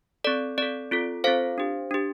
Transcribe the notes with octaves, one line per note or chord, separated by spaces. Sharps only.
C4 A4 D5
C4 A4 D5
C4 F4 A4
C4 F4 A4 C5 F5
D4 G4
D4 G4